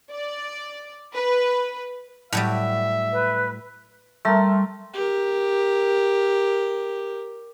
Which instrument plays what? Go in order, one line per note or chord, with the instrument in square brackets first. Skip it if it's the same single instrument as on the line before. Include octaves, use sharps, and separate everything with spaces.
[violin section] D5
B4
[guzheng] A2 F#3 G3 [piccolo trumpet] E5
[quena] B4
[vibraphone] G3 C6 [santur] A3 A#4
[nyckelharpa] G4 A#4